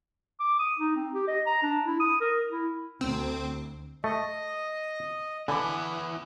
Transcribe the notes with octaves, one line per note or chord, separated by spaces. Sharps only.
D6
D#6
D#4
C4
G4
D#5
A#5
D4
E4
D#6
A#4
E4
D2 C4
A3 D#5
D3 E3 B3 G#5 B5 D6